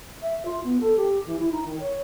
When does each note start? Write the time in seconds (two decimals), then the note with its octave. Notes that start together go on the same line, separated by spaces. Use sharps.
0.22 E5
0.45 F4
0.63 B3
0.80 A4
0.96 G4
1.25 E3
1.39 E4
1.52 D#4
1.65 D#3
1.79 C#5